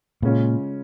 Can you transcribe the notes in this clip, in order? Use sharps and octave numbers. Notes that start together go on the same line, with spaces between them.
A#2 C#3 G#3 C#4 F4